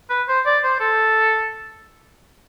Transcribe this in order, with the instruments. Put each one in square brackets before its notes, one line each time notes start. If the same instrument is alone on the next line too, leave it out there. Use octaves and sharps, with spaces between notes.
[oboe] B4
C5
D5
C5
A4